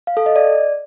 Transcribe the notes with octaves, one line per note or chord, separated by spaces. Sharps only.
F5
A4
D#5
D5